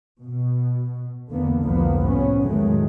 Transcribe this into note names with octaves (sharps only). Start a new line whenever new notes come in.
B2
E2 D3 A#3 B3
C2 F2 D3 F3 A#3 B3
A2 C3 B3 C#4
E2 A2 D#3 F#3 G#3 A3